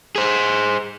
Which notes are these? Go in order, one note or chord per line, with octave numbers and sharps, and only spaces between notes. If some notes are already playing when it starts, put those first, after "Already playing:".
G#4 C5